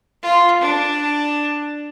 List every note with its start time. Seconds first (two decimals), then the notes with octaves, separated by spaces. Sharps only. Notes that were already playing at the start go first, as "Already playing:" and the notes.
0.22 F4
0.61 D4